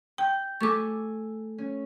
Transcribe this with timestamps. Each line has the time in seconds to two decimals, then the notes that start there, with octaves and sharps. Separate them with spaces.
0.18 G5 G6
0.61 A3 A4 G#5 C#6 D6
1.58 C#4